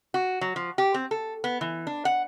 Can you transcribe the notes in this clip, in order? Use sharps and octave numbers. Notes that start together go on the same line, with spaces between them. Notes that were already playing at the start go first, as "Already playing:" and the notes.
F#4
F#3
F3
G4
C4
A4
B3
E3
D4
F#5